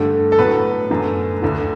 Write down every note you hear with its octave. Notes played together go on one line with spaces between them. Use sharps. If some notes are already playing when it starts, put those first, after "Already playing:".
Already playing: G2 D3 A3
A4
A2 F#3 B3 B4
F#2 D3 A3
D2 D3 A3